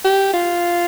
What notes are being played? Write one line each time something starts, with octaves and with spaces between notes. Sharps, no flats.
G4
F4